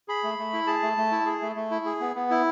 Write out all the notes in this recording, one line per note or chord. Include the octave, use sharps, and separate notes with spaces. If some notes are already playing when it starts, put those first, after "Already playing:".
G#4 B5
A3
A3
E4
G#4 A5
A3
A3
E4
G#4
A3
A3
E4
G#4
B3
B3
E4